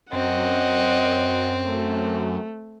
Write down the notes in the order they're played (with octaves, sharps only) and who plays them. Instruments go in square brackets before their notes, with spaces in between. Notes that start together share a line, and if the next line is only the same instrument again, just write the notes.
[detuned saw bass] F#2 [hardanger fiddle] C4 [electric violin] D#5 F#5
[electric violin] A3